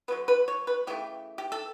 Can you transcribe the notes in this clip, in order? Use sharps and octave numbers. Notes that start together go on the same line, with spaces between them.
D3 F#3 B3 B4
B4
C#5
B4
C#3 E3 A3 G4
G4
A4